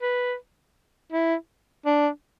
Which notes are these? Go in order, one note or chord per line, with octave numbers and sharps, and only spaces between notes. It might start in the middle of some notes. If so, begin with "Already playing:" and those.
B4
E4
D4